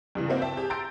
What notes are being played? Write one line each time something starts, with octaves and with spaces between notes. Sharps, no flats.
G2 C#3 E3
A#3 C4 E4 F#4 A#4
E5 G5 A5
G4 G#4 A5
A#5 C6 E6 G6 A6 D7